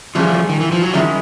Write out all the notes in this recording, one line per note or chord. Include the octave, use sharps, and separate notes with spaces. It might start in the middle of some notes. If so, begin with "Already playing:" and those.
E3 F3 G3 A3 C#4 F4 G#4
D#3
E3
F3
F#3
D#3 F3 G3 G#3 C#4 E4